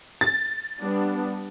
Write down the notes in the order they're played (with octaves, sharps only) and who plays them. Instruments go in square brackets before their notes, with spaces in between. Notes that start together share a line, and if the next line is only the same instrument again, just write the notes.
[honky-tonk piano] A6
[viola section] G3 B3 D4